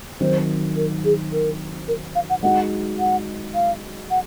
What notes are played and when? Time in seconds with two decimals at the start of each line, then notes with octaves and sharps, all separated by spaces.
0.20 D#3 F#3 C4 D#4 C5
0.76 A#4
1.04 G#4
1.32 A#4
1.88 A#4
2.15 F5
2.29 F#5
2.43 G#3 D#4 F#4 F#5
2.99 F#5
3.54 F5
4.10 F#5